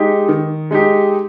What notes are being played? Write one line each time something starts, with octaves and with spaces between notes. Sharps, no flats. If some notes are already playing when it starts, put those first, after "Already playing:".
Already playing: G#3 D#4 G4
D#3
G#3 D#4 G4